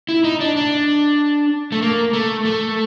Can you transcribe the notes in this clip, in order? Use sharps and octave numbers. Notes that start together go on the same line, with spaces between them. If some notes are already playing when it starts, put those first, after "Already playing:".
E4
D#4
D4
D4
A3
A#3
A3
A3